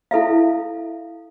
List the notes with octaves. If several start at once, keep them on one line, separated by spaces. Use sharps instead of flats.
E4 A4 E5 F5